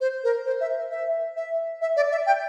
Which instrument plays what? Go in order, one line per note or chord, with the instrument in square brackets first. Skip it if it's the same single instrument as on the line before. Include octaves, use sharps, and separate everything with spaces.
[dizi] C5
A#4
C5
E5
E5
E5
E5
D5
E5
G5